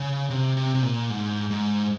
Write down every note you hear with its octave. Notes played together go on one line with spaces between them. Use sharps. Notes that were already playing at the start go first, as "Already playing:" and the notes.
Already playing: C#3
C3
C3
C3
A#2
G#2
G#2